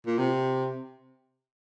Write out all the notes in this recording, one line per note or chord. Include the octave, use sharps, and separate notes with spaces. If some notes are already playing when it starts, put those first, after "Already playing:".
A#2
C3